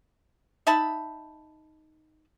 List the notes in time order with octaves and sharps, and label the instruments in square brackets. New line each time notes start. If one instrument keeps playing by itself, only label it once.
[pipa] D#4 E5 A5 B5